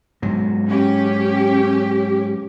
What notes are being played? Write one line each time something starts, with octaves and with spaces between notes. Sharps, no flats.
G#2 B2 F#3
C#4 G4